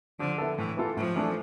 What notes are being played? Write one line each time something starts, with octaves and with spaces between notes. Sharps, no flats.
D3 F3
B3 E4 A4
A2 E3
E3 B3 F4 A4
A2 F3
E3 A3 D4 A4